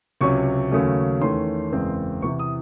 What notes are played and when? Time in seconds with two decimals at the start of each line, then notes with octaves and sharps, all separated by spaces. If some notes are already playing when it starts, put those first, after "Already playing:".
0.21 C#2 C3 F#3 C#4 C#6
0.72 D#2 C#3 F#3 A3 C#4
1.21 E2 D#3 A3 C#4 C6
1.72 F#1 E2 C#3 G#3 C4
2.22 E2 C3 E3 C#6
2.39 D#6